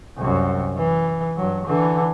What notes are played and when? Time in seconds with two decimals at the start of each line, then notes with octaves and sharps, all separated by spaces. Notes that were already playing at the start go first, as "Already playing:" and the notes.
0.18 C2 F#2
0.77 E3
1.37 G2 F#3
1.66 D3 E3